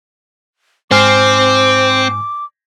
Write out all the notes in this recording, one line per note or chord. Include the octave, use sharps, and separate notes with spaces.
G#2 C4 C5 G#5 D6 F6